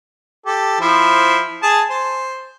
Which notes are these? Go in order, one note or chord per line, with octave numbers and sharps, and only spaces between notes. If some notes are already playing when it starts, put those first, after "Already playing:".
G4 A4
F3 E4 C5
G#4 A5
C5